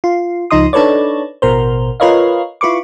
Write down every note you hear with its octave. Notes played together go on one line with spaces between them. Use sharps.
F4
C#2 F3 D#4 D#5 C6 D#6
D4 D#4 A4 B4 C#5 D5
A1 B2 A#4 C5
F4 A#4 B4 C#5 D#5 F5
E4 F4 B4 C#6 D6